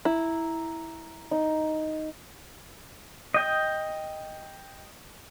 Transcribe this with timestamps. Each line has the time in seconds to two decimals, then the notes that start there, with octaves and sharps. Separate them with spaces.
0.05 E4 A#5
1.31 D#4
3.34 D#5 G5